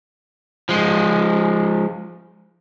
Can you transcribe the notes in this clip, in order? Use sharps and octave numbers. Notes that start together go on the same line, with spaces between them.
F3 G#3